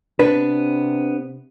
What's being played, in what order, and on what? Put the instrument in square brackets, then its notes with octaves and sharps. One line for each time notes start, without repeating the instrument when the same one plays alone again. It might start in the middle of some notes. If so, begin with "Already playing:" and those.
[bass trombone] C3 [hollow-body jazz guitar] B3 D4 B4